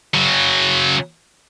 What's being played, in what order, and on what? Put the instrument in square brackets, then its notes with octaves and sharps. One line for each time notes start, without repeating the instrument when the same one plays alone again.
[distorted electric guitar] C#3 F#3